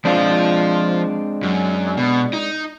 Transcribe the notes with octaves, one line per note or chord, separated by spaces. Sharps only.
F3 G#3 C4 D4 F5
F#2
B2
D#4